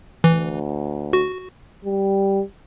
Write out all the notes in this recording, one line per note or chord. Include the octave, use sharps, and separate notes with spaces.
D2 E3
F#4
G3